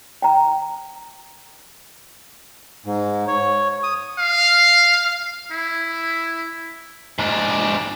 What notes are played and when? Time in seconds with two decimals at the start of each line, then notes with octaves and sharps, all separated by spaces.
0.22 G5 A#5
2.86 G#2
3.28 C#5
3.84 D#6
4.18 F5
5.51 E4
7.18 G#2 D4